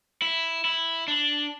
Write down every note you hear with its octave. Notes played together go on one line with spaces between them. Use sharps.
E4
E4
D4